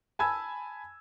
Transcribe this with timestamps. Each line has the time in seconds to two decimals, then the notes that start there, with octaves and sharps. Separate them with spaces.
0.19 G#5 A5 B5 E6 G#6